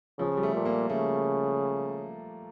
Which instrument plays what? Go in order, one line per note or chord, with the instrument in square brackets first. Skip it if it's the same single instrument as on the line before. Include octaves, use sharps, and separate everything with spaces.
[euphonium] C#3 [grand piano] F3
[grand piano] G3
A3
[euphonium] A#2
[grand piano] A#3
[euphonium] C#3 [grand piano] A3